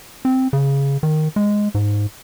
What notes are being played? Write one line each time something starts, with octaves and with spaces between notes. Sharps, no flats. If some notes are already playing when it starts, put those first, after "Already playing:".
C4
C#3
D#3
G#3
G#2